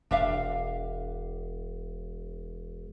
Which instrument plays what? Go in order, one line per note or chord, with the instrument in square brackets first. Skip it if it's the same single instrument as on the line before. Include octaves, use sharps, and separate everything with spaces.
[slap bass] E1 [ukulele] D4 E5 F5